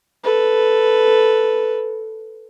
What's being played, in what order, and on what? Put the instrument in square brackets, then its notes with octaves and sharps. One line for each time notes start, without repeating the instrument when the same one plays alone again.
[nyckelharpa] A4 B4